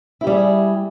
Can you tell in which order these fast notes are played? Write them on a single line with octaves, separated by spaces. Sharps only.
E4 G4 G3 G#4